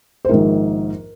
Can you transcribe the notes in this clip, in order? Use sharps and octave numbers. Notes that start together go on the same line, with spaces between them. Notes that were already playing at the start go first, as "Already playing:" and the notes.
C5
A#1 G#2 D#3 A#4